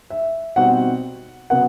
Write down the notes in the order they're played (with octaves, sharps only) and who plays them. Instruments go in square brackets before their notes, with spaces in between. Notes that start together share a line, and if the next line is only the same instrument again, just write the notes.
[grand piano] E5
[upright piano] B2 G3 C4 D#4 F#4 [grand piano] F#5
[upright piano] C#3 F#3 B3 [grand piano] F#5